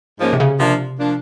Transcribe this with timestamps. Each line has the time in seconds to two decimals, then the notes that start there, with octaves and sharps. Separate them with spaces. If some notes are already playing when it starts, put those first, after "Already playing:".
0.20 G#2 F3 A#3 C#4
0.33 C3
0.40 C#3
0.60 C3 F3 A#3 D4
1.00 F3 A#3 D4